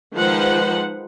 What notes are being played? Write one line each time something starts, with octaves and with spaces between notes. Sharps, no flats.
D#3 F3 G#3 B4 C5 F#5